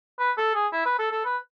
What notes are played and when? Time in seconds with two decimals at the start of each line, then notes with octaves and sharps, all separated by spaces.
0.19 B4
0.38 A4
0.55 G#4
0.73 E4
0.85 B4
0.99 A4
1.12 A4
1.25 B4